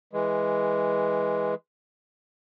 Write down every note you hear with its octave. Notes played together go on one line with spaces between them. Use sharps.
E3 G#3